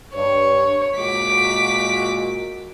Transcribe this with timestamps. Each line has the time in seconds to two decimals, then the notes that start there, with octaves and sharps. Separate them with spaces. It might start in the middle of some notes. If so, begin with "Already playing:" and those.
0.15 G2 C#5
0.98 A#2 G#3 F#4 D6 B6